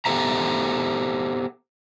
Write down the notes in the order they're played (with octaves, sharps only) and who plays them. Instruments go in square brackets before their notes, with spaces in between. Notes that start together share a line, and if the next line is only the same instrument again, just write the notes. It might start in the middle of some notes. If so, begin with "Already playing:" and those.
[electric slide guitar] B3 G4 A4 C5 E5 A#5